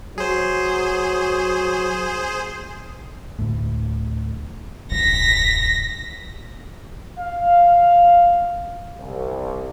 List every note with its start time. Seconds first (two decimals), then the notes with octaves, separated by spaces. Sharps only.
0.18 F#3 G#4 C5
3.39 D2 A2
4.91 D1 B1 F#2 A#6 B6
7.18 F5
8.98 C2